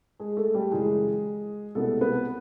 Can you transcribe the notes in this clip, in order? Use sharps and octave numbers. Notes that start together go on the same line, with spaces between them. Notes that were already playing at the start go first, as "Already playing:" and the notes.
G#3 G#4
A3 A4
G3 G4
F#2 C#3 E3 G#3 G#4
C2 B2 G#3 A3 B3 A4
B3 B4